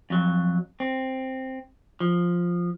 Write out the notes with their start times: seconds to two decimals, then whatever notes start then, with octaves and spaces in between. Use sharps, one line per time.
0.10 F2 F#3
0.80 C4
2.00 F3